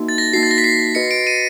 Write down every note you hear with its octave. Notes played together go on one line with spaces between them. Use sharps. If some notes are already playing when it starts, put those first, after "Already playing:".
Already playing: A#3 D#4 F#4
A6
A#6
A#3 D#4 F#4 C7
A6
A#6
B6
C7
F#4 B4 D#5 C#7
D7
D#7